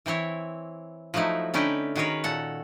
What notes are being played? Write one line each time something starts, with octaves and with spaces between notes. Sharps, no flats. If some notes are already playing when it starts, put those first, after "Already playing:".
E3 C4 E4 C#5
F3 F#3 A3 D#4 E4
D3 C#4 D#4 E4 B4 G5
D#3 F#4 G#4 A#4 B4 C#5
A#2 A4 F#5